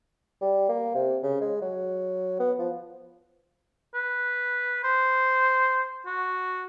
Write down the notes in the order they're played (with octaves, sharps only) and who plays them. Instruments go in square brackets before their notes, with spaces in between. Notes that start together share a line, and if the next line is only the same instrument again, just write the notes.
[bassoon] G3
A#3
C3
C#3
G#3
F#3
B3
F3
[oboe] B4
C5
F#4